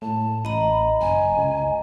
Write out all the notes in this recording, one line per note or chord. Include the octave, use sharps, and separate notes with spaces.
A2 A5
A1 D#5 A#5 B5
F#1 G#5
C#2